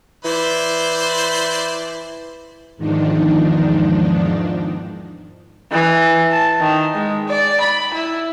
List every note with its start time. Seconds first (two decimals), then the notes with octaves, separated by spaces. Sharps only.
0.25 E3 E4 C5 D5
2.77 E2 G#2 D#3 F3 D4 D#4
5.72 E3
6.31 A5
6.60 D#3
6.94 G#3
7.28 D5
7.60 B5
7.94 E4